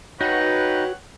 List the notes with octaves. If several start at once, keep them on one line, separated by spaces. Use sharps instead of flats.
D#4 F#4 B4 C#5 F#5 G5